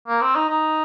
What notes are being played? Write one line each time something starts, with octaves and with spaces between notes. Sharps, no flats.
A#3
C4
D#4
D#4